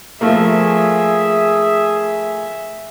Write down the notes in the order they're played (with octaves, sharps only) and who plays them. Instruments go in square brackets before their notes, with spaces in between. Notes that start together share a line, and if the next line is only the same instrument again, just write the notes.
[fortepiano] F3 A3 A#3 [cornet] G#4 [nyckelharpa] E5